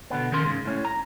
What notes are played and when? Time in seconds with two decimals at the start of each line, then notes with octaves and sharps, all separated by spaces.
0.10 B2 D3 B3
0.32 D#3 C#4 A#4 C6
0.44 G#2 C#3
0.65 A2 C#4
0.85 A#5